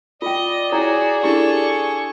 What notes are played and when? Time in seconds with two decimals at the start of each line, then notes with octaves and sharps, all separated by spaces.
0.22 F4 D5 D#5 G5
0.72 E4 F#4 G#4 C#5 A#5
1.23 D4 E4 G4 A4 C#6